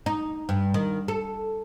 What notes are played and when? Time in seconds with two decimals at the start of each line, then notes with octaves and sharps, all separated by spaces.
0.06 D#4
0.49 G2
0.74 D#3
1.08 A4